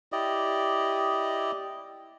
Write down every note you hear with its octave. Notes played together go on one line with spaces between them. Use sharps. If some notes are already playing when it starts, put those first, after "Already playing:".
E4 G4 D5 D#5